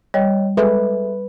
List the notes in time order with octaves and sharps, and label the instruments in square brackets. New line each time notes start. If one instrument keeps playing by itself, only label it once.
[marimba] G3 [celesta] C#5 D#5 G5
[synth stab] G#3 [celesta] A4 E5 [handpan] B4